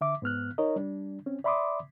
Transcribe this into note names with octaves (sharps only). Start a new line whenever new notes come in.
D3 E5 D6
G#2 B3 F6 F#6
D#4 A#4 C#5 D#5
G3 D4
C4 C#4
D5 E5 B5 C6 D6 D#6